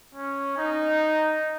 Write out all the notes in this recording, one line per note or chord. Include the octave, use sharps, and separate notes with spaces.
C#4
D#4